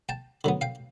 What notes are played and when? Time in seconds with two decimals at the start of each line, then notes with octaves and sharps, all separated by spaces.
0.09 G5 A5
0.44 D3 F#3 B3
0.61 F5 G5